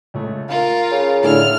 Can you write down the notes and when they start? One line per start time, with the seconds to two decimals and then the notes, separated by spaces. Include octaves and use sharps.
0.14 C#2 A3
0.49 F4 A#4 F5
0.91 C#3
1.24 A2 D3 A4 E5 G#5 F6